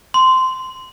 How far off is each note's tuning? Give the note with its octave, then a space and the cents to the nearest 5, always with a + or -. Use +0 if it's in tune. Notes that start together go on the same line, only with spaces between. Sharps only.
C6 -15